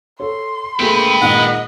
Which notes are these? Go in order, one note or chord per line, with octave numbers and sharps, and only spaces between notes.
A4 C#5 C6
A3 A#3 G#4 B4 G5
A#2 D#3 G#3 D#5 F#5